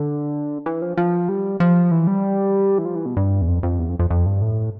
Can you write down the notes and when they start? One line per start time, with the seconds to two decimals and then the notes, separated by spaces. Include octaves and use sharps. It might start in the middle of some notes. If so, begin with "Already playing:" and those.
Already playing: D3
0.66 E3
0.82 F3
0.97 F3
1.29 G3
1.60 F3
1.91 E3
2.07 G3
2.78 E3
2.85 F3
2.95 E3
3.06 B2
3.17 G2
3.42 E2
3.48 F2
3.63 F2
3.79 E2
3.89 F2
3.99 F2
4.10 F2
4.26 G2
4.42 A2